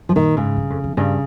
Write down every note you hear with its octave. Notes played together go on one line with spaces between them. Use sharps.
F3
A#2 D#3
G#2 C#3
G2
F2
F2
G2 C#3